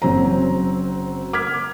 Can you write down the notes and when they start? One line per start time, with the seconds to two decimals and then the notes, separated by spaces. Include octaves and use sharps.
0.02 F#1 F#3 C4 C#4 C5 A#5
1.33 D6 F6 G#6 B6